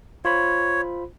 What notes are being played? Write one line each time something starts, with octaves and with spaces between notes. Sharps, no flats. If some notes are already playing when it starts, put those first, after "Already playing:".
F4 C5 C#5 B5